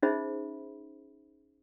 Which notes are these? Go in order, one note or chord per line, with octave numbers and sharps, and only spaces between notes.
C#4 D#4 G#4 C5 E5 B5